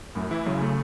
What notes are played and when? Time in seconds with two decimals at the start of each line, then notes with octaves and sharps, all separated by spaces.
0.15 F#2 A2
0.31 E3 E4
0.46 F#2 C#3
0.61 A3